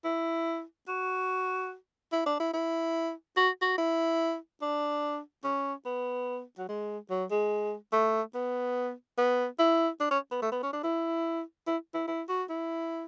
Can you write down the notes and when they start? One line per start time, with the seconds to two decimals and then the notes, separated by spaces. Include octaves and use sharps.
0.05 E4
0.88 F#4
2.12 E4
2.26 D4
2.40 E4
2.53 E4
3.37 F#4
3.62 F#4
3.78 E4
4.62 D4
5.44 C#4
5.85 B3
6.58 F#3
6.69 G#3
7.10 F#3
7.31 G#3
7.93 A3
8.34 B3
9.18 B3
9.59 E4
10.00 D4
10.11 C#4
10.32 B3
10.42 A3
10.52 B3
10.63 C#4
10.73 D4
10.83 E4
11.67 E4
11.94 E4
12.08 E4
12.29 F#4
12.49 E4